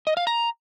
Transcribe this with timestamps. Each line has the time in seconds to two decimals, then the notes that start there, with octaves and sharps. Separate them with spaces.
0.07 D#5
0.17 F5
0.27 A#5